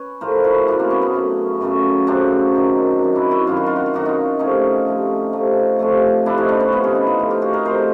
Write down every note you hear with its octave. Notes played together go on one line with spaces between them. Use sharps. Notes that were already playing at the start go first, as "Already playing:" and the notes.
Already playing: C#4 B4 C#5
A2 F3 A3 A#4 C5
E4 F#4
F#2 C#3 F#3 A3 D4 E4
A#3 C4
B3 C#4
B3 C#4
F#2 C#3 F#3 A3
F#2 C#3 F#3 A3
F#2 C#3 F#3 A3 C4 D4
F#2 D#3 F#3
F#2 D#3 F#3
D4 E4
E4 F#4
F#2 D#3 F#3 F4
F#4
F4
F#4
F4
F#2 D#3 F#3 F#4
D#4 F4
C3 F3 A3 C#4 D#4
C3 F3 A3
C3 F3 A3
C3 F3 A3
C3 F3 A3 D4 E4
C#4 D#4
C4 D4
B3 C#4
C3 F3 A3 B3 C#4
C#4 D#4
D4 E4
D#4 F4
C3 F3 A3
F4 G4
F#4 G#4
G#4 A#4
C3 F3 A3 A#4 C5